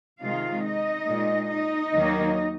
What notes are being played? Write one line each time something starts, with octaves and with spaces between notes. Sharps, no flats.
C3 D#3 G#3 F4 F5
D#4 D#5
A#2 G#3
D#4 D#5
D#2 D#3 F#3 A#3